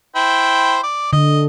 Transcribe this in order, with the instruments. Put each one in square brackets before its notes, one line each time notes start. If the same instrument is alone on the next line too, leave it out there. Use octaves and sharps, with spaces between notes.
[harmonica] E4 C5 G5
D5
[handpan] D3 [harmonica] D#5